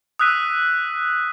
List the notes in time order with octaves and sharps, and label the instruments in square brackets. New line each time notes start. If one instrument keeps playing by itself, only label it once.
[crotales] D#6 E6 F#6 B6 D#7